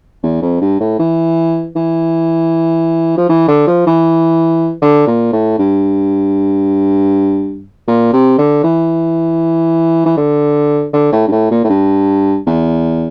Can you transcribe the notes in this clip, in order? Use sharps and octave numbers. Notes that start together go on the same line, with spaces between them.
E2
F2
G2
A2
E3
E3
F3
E3
D3
F3
E3
D3
A#2
A2
G2
A#2
C3
D3
E3
E3
D3
D3
A2
G2
A2
A#2
A2
G2
E2